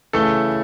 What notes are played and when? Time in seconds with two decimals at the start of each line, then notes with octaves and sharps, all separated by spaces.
0.13 C#3 E3 A3 A4